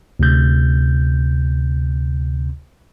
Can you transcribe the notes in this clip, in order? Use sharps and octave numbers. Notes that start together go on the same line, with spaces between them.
D2 C3 G6